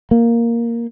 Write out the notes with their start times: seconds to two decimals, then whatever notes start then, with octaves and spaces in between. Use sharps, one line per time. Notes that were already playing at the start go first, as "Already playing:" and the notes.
0.11 A#3